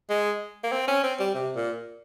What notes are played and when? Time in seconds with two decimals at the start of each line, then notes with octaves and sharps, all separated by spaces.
0.10 G#3
0.64 A#3
0.72 C4
0.88 C#4
1.03 C4
1.19 G3
1.35 C3
1.56 A#2